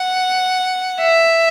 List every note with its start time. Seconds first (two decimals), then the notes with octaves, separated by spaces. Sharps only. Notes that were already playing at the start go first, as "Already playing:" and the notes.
Already playing: F#5
1.01 E5